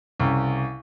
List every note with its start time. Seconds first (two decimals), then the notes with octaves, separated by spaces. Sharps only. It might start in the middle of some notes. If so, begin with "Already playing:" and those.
0.20 C2 C#3